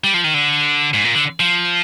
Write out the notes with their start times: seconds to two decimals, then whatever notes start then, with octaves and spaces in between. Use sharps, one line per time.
0.04 G3
0.14 F3
0.24 D#3
0.34 D3
0.94 G#2
1.05 A#2
1.15 D3
1.40 F3